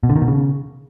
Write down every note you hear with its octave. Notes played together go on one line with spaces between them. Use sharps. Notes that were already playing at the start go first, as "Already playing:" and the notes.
B2
D3
D#3
B2
C#3